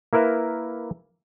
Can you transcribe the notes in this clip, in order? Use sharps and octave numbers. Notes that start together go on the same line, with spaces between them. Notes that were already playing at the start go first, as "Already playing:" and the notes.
A#3 E4 A#4 B4 E5